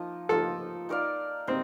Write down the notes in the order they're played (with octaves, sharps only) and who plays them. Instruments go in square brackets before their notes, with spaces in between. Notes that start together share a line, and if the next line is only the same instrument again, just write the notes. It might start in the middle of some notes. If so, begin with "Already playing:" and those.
Already playing: [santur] F3 A#3 D#4
[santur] F3 A#3 D#4 [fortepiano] A4
[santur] D#4 A#4 D5 F5
[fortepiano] C4 [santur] D#4